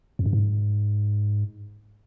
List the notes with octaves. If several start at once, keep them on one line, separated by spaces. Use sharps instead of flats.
F2
G2
G#2